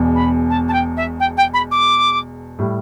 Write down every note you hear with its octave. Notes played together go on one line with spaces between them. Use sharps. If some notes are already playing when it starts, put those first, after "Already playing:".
Already playing: E1 E2 B2
B5
A5
A5
G5
E5
G5
G5
B5
D6
A2 G3